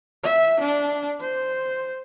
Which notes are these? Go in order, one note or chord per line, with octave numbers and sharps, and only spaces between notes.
E5
D4
C5